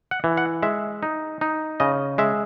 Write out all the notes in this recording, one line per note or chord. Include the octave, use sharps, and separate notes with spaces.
F#5
E3
F#5
G#3 E5
D#4
D#4
C#3 D#5
G#3 E5